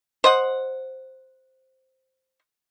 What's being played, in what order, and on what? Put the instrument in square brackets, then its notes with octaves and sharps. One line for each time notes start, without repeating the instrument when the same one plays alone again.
[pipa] C5 D#5 F#5